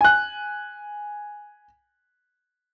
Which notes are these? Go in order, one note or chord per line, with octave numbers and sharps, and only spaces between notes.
G#5 F#6